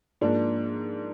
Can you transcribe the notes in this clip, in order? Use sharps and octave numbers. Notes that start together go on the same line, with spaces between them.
G#2 F3 A#3 D4